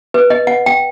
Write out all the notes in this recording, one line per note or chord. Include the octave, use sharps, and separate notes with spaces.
B4
D#5
F#5
G5